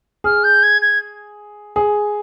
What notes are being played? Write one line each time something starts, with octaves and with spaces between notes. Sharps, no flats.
G#4 F6
G6
G#6
G#6
G#4